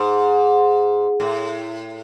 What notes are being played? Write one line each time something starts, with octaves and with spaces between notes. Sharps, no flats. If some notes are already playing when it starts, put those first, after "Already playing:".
Already playing: G#2
A2